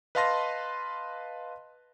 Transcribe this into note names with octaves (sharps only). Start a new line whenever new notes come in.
B4 D#5 F5 A5 C6 A#6